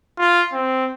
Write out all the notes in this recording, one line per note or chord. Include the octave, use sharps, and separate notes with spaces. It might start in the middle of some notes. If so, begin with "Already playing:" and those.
F4
C4